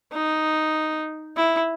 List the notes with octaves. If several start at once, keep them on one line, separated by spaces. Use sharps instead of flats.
D#4
E4